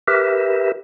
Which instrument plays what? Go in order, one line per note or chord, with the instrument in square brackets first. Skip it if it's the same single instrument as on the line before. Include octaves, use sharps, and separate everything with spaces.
[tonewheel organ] G4 A#4 B4 E5